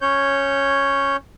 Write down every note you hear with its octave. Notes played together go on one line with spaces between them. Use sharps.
C#4 C#5 G6